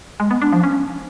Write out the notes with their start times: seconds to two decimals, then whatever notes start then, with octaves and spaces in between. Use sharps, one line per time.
0.20 G#3
0.31 B3
0.42 D4
0.52 F3
0.63 C#4